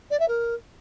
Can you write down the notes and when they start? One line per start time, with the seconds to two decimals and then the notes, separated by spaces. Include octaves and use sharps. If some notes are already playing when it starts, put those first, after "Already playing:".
0.11 D5
0.20 E5
0.28 A#4